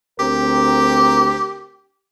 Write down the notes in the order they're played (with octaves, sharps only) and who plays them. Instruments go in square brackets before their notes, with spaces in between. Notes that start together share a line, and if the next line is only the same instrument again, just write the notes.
[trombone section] D2 C4 A#4 [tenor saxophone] G4